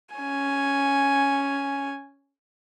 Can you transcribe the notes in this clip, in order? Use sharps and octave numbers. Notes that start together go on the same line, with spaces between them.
C#4 G#5